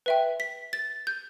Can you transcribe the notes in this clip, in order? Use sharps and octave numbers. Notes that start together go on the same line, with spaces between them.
B4 E5 G5
B6
A6
G6